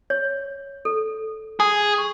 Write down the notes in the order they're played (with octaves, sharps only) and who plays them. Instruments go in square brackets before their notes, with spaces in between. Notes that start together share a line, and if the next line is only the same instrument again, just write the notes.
[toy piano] C#5
A4
[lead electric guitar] G#4 [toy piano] D#6
[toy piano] C#6